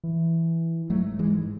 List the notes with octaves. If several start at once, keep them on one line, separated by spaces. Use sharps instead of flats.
E3
G#2 F#3 A3
G#2 E3 G#3